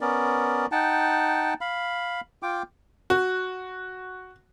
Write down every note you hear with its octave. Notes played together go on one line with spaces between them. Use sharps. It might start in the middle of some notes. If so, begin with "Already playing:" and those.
B3 C#4 A#4 D5
D#4 F#5 G5 A5
F5 B5
F4 G5 D6
F#4